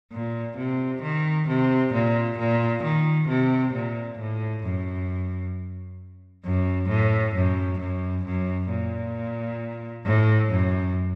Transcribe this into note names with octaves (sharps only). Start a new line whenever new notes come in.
A#2
C3
D#3
C3
A#2
A#2
D#3
C3
A#2
A2
F#2
F#2
A2
F#2
F#2
F#2
A#2
A2
F#2